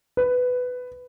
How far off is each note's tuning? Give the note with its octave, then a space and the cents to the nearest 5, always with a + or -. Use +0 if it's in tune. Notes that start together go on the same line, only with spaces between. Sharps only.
B4 +10